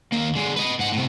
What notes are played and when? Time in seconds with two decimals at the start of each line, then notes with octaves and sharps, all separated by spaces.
0.12 D#2 A#3
0.35 D3 G#3
0.56 B4 D#5
0.79 G#2 F#5
0.92 A2 C3